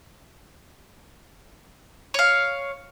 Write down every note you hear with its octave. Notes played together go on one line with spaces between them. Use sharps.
C#5 F5